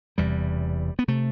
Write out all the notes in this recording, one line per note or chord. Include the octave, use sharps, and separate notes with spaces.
E1 E2 C3 G3
B3
C3 A3